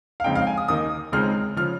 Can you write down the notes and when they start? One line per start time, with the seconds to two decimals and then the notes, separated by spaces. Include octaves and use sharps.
0.20 F5
0.24 F2 C#3 G#3 C4 D#4 G5
0.35 F5
0.47 G#5
0.58 D#6
0.68 D#2 D#3 A#3 D#4 D#6
1.12 C#2 C#3 G#3 C4 D#4 F6
1.57 C#3 F3 F6